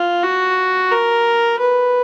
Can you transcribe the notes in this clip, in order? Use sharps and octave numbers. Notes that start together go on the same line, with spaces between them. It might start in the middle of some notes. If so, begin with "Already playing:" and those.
Already playing: F4
F#4
A#4
B4